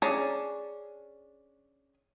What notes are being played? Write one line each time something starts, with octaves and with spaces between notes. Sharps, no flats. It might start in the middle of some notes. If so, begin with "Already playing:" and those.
C#4 D4 G#4 A5 A#5